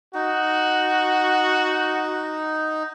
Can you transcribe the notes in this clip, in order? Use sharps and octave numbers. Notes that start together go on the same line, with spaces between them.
D#4 F#4